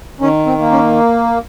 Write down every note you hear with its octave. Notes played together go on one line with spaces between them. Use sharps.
D#3 C#4
C4
A#3
C#4